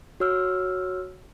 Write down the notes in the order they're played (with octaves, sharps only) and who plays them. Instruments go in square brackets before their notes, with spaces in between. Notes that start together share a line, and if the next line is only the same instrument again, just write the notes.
[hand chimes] F#4 C#5 E6 F6